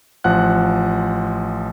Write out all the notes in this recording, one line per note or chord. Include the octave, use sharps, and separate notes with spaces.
A1 F3 F#5 F#6